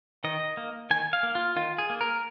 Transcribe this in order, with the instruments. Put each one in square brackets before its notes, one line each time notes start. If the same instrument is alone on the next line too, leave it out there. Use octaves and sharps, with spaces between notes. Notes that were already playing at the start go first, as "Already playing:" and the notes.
[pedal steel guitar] D#3 D#5
A#3
D#3 G#5
F5
A#3
F4
D#3 F4
G#4
A#3
A#4